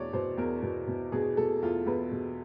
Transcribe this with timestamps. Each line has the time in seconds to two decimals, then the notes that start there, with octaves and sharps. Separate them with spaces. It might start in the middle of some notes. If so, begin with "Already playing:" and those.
Already playing: E2 B2 C#5 D5
0.13 B2 C5
0.37 E2 A#4
0.62 B2
0.87 B2
1.12 B2 G#4
1.37 B2 A4
1.62 E2 F4
1.86 E2 B4
2.11 B2